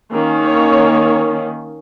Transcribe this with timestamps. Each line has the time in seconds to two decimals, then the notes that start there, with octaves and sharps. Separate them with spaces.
0.12 D#3 A#3 C#4
0.44 C#5